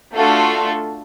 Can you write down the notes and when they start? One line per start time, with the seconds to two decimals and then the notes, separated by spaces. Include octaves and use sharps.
0.15 A3 D4 F4 F#4 A4